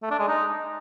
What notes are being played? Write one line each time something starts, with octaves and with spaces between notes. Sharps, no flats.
A3
D4
G#3
D#4